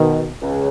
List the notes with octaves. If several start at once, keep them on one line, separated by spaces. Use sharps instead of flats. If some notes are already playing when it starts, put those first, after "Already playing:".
Already playing: B2 D#3
C#2 C#3